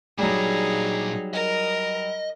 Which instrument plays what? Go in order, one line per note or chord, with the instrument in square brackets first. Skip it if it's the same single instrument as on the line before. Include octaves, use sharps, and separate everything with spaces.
[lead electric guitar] A#2 D4 [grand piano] F#3 G3 [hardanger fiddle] D#4 G#4
[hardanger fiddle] A#4 [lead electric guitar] D#5